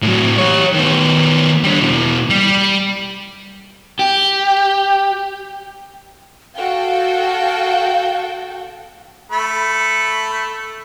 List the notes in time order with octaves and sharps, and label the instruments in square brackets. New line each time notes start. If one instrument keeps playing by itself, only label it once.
[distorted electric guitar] A2 F#3
G4 C#5
D#3 B3
D3 G3
B2 E4
G3
[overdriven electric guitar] G4
[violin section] F#4 A4 G5 [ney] F5
[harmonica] A3 B5